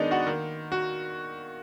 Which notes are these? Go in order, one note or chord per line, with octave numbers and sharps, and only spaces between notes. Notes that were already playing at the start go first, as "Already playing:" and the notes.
Already playing: D#3 G#3 B3 D4 D#4 D5 D#5
F#4 F#5
D#3 A#3
F#4